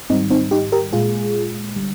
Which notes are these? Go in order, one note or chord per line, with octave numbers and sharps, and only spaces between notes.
G#2 D#3 G3 C4 D#4
C4 D#4
D#4 G4
G4 A#4
A#2 G#3 F4 G#4
D3 G3